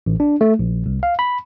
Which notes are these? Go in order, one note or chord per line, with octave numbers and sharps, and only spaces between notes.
A1
D4
A3
A#1
C2
F5
B5